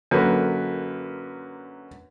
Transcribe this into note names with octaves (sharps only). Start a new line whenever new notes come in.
F#2 D3 A#3 B4